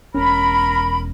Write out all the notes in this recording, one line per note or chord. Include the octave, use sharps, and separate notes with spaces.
E1 C#4 A#4 B5